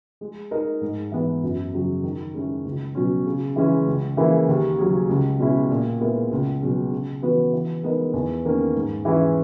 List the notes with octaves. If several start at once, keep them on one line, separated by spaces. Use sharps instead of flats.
G#3
D#4 A#4
G#2
E3 B3 E4
F#2
C#3 F#3
D#3
G#3 C#4 E4
C#2
B2 F#3 C#4
C#3
E3 G#3 C#4 E4
C#2
C#3 E3 A#3 E4
D#2
C#3 F#3 C#4 G#4
C#2
B2 G#3 C#4 E4
A#2
G#3 B3 E4 A#4
C#2
B2 F#3 C#4 G#4
C#3
E3 B3 F#4 B4
E3
G#3 B3 D#4 A#4
E2
D#3 A#3 C#4
G#2
E3 G#3 C#4 E4